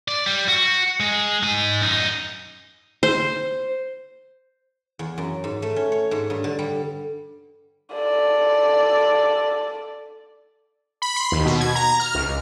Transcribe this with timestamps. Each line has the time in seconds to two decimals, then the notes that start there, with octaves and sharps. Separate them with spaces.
0.08 D5
0.26 G3
0.48 F#4
1.00 G#3
1.43 D#4 G#5
1.82 F#2 D#4
3.03 C5
4.99 E2
5.18 F#2
5.44 G#2
5.62 A3
5.76 C#4
5.92 C#5
6.11 G#2
6.30 G2
6.44 D3
6.59 G3
7.94 A4 D5
11.02 B5
11.16 C6
11.32 D#2
11.46 B2
11.61 G#6
11.75 A#5
12.00 F6
12.15 C#2